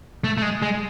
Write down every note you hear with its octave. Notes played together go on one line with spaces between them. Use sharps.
A3
A3
G#3
G#3